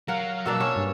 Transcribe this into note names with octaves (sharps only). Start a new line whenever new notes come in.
F#3 A#4 F5 F#5
B2 A#3 D4 E6
C#4 C#5
G2